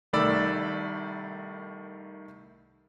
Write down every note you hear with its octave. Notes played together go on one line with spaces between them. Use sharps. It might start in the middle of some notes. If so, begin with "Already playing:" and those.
C2 D#3 A3 D5 B5 E6